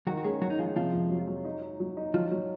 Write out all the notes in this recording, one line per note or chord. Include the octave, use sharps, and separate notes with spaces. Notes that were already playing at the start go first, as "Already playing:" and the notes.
D#3 F#3 F#4
F#4
G#3 C#4 G#4
F#3 C#4 F#4
D#4
F3 G#3 F4
C3 F3 F4
F2
F#3
F#3
D#4
D#4
F#3
D#4
F3 F#3 F4
F#3